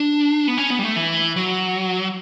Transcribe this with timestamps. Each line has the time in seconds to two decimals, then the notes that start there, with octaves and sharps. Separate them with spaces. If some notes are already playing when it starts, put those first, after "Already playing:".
Already playing: D4
0.48 B3
0.58 C#4
0.70 B3
0.79 G3
0.83 A3
0.96 E3
1.36 F#3